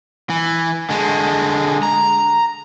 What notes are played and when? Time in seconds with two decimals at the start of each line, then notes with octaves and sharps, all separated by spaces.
0.30 E3
0.90 D3 G#3
1.83 A#5